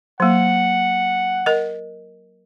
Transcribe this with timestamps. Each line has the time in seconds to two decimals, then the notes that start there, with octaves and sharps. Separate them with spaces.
0.20 F#3 A#3 F#5
1.46 A#4 D#5